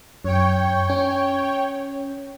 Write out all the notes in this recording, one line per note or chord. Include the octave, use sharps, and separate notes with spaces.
F#2 C#5 G5
C#4